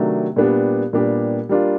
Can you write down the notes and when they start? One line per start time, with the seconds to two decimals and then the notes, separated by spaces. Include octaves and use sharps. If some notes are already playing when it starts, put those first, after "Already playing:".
Already playing: C3 D#3 F#3 A3 D4
0.36 A#2 G3 B3 D4 G4
0.93 A#2 G3 B3 D4 G4
1.49 G3 A#3 D4 F4